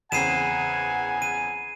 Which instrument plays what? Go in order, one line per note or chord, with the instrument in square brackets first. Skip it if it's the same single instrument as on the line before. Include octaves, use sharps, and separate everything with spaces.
[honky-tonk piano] E2 C#3 C4 [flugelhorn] F#5 [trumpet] G#5 [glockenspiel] C7 D#7 E7
[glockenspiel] D#7